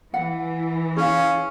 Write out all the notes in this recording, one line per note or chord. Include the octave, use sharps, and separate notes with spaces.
E3 F#5
C#4 G#4 F5